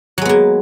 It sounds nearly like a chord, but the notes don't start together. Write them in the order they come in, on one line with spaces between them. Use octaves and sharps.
F#3 G#3 B3 A#3